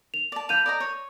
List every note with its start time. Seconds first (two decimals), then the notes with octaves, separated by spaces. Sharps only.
0.14 F7
0.32 D5 A5
0.49 F5 B5 G6 D#7 F7
0.66 D5 D#5 A#5
0.80 C#5